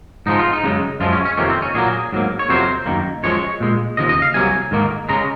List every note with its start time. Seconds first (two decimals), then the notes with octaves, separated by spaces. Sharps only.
0.26 G#2 F3 G#3 D#4
0.39 F4
0.53 D#4
0.63 F#2 C#3 G#3
1.00 F#2 F3 G#3 F4
1.13 C#4
1.25 C#4
1.37 F2 C3 D#3 A#3 C#4
1.50 C4
1.62 C#4
1.74 A#2 F#3 A#3 G#4
2.12 G#2 F#3 A#3
2.39 C#5
2.49 F2 C3 F#3 A#3 C5
2.86 F#2 D#3 A#3
3.23 F#2 F3 G#3 C#5
3.60 A#2 G#3
3.97 D#2 C#3 F3 D#5
4.09 D#5
4.22 F5
4.34 C2 C3 F#3 A#3 G#5
4.71 G#2 D#3 A#3
5.09 C#3 G#3 A#5